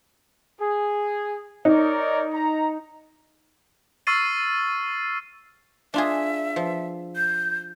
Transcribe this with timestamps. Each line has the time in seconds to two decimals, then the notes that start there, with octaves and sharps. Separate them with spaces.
0.59 G#4
1.65 D#4 A#4 C#5 D5
2.33 A#5
4.07 C#6 E6 F6 A6 C7 D#7
5.94 D4 F4 G#4 E5
6.56 F3
7.16 G6